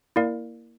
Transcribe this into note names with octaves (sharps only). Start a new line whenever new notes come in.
A#3 E4 A#4 D5 F5